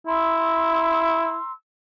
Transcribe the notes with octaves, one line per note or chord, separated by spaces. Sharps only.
E4 A#5 C6 E6